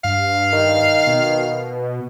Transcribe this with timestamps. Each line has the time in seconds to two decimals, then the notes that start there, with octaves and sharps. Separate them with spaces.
0.04 G2 F5
0.53 D#3
1.07 B2